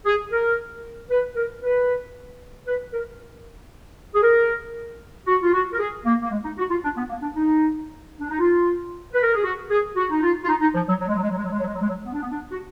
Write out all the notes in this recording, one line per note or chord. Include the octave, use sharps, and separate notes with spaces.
G#4
A#4
B4
A#4
B4
B4
A#4
G#4
A#4
F#4
F4
F#4
A#4
G#4
A#3
A#3
G#3
D#4
F#4
F4
D4
B3
A#3
D4
D#4
D4
D#4
F4
B4
A#4
G#4
F#4
G#4
F#4
D#4
F4
F4
D#4
D#4
F3
F#3
F#3
G#3
F#3
G#3
F#3
G#3
F#3
G#3
F#3
G#3
F#3
G#3
F#3
B3
D4
B3
D4
F#4